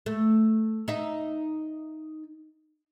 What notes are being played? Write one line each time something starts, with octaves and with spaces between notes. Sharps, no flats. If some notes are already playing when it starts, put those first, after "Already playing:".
A3
D#4 E5